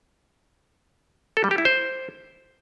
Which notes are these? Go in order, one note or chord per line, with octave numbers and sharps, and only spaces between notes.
A4
G3
G4
E4
C5